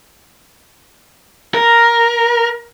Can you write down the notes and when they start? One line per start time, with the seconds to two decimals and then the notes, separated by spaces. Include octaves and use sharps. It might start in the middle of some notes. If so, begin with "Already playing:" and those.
1.54 A#4